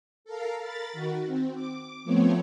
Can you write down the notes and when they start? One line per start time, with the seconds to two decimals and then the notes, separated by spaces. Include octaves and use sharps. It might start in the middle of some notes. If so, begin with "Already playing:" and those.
0.25 A4 A#4 F5
0.61 A#4 B5 A6
0.93 D#3 F#4
1.26 C4
1.55 D6
2.04 F3 A3 B3 C4 C#5